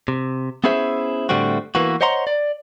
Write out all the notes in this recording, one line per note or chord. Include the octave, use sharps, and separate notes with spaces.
C3
B3 C#4 E4 G#4 C5 E5
A2 D3 G3 A3 C4 F#4
E3 A#3 B3 F#4
C5 C#5 D#5 F#5 A#5 C6
D5